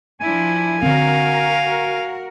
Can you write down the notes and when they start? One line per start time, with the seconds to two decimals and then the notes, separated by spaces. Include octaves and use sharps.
0.21 F3 D4 E4 G#5
0.83 D3 C4 F#4 A#4 F5